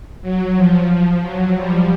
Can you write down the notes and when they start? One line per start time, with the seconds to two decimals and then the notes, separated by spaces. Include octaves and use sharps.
0.22 F#3
0.55 F3
0.89 F3
1.22 F#3
1.55 F3 G3